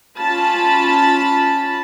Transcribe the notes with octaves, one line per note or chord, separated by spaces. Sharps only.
C#4 F4 A5 B5